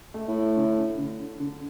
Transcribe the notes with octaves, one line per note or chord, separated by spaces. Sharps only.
A3
A2
D3
D3
D3